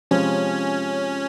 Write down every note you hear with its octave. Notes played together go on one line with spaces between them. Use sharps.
C3 F3 G#3 C#4